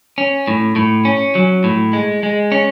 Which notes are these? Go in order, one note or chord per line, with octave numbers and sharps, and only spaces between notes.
C#4
A2
A2
C#4
F#3
A2
G#3
G#3
C#4